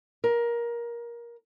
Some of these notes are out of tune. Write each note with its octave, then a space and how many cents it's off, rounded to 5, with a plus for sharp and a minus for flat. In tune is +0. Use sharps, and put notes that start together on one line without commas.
A#4 +20